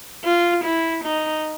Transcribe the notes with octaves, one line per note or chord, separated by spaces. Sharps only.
F4
E4
D#4